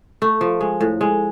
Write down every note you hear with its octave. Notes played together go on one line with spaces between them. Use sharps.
A3
F3
G#3
A2
G#3